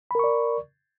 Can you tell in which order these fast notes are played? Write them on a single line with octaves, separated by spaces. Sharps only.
B5 A#4 C#6 D5